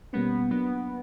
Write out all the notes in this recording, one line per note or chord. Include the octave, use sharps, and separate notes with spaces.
B2 G3 A#3 B3 C#4
F#3 A#3 B3 D4